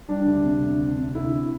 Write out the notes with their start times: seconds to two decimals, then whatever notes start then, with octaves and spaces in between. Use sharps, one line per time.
0.08 G3 D4
0.26 D2
0.44 C3
0.62 D2
0.80 D2
0.98 C3
1.15 D2 E4